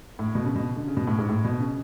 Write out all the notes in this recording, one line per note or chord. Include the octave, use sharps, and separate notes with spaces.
A2
B2
C#3
B2
D3
C#3
B2
A2
G#2
A2
B2
C#3